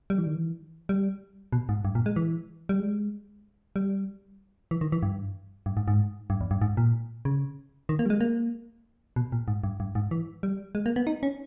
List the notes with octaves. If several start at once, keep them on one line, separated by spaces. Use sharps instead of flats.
G3
E3
D#3
E3
G3
B2
G#2
G2
A#2
G#3
E3
G3
G#3
G3
E3
D#3
E3
G2
G2
G#2
G#2
G2
E2
G2
G#2
A#2
C#3
D#3
A#3
G3
G#3
A#3
B2
A#2
G#2
G2
G2
G#2
E3
G3
G#3
A#3
B3
D#4
C#4